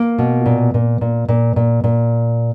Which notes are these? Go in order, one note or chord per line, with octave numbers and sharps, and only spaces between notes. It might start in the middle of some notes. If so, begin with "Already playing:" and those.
Already playing: A#3
B2
A#2
A#2
A#2
A#2
A#2
A#2